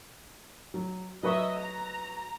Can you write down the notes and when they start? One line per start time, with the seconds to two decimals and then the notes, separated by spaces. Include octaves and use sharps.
0.74 F#3
1.23 F#3 B4 D#5 E5 C#6
1.58 A#5